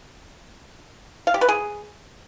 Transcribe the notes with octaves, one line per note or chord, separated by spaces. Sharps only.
F5
G4
B4
G#4